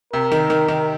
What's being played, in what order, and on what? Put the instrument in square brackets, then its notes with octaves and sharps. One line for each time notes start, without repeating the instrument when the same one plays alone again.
[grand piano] C3 [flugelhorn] A#4
[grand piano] D#3
D#3
D#3